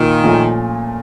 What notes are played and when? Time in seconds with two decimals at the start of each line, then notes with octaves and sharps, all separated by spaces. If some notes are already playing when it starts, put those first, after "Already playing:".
Already playing: A#2 D#3 F4
0.23 A#2 F3 A3 C#4 F4